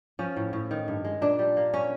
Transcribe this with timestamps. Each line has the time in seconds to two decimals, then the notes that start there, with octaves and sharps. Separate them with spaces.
0.19 F3 C#4
0.37 A2
0.53 A2
0.71 D#3
0.88 G2
1.05 G#3
1.22 A#2 D4
1.39 G3
1.57 A#3
1.74 C#4